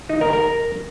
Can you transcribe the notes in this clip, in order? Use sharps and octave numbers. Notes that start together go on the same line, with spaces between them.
D#4
A#4
A#4